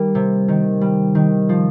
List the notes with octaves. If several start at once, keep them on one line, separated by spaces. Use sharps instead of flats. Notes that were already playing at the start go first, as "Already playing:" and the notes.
Already playing: D#3 G3 A#3
C3
D#3
G3
D#3
F3